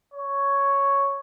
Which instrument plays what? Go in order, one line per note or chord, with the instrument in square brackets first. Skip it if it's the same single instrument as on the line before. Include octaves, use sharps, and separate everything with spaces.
[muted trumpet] C#5